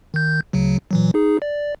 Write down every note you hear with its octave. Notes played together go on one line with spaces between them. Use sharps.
D#3 G6
D2 C#3 F#3
A#2 E3 F#3
D#4 G#4
D5